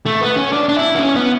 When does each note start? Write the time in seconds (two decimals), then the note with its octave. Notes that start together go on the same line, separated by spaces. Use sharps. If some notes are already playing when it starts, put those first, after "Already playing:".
0.06 A3
0.21 B3
0.37 C#4
0.52 D4
0.69 D4
0.77 E4
0.95 B3
1.00 C#4
1.16 B3